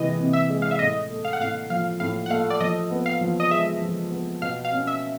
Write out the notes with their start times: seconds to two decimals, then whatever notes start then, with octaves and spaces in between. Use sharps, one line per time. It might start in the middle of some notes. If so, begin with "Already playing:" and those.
Already playing: C3 E3 G#3 D#5
0.19 C3
0.33 E5
0.50 G#3
0.62 F5
0.71 E5
0.79 A2 D#5
1.10 A3
1.25 F5
1.33 F#5
1.40 A2 F5
1.70 F3 F5
2.00 A2 F5
2.26 F#5
2.30 A3 F5
2.50 D5
2.60 F3 D#5
2.91 B3
3.06 F5
3.21 F3
3.40 D#5
3.51 G#3 E5
3.82 F3
4.11 B3
4.42 B2 F5
4.65 F5
4.72 C#4
4.87 E5